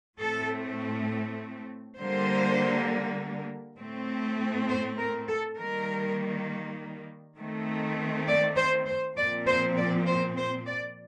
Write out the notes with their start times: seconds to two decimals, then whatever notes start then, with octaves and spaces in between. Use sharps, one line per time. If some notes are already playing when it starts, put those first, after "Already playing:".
0.18 A2 A3 C4 A4
1.98 D3 G3 A#3 C5
3.77 A2 A3 C4
4.68 C5
4.98 A#4
5.28 A4
5.57 D#3 G3 A#3 A#4
7.37 D#3 A3 C4
8.27 D5
8.56 C5
8.87 C5
9.17 A#2 F3 C4 D5
9.47 C5
9.77 D5
10.07 C5
10.37 C5
10.67 D5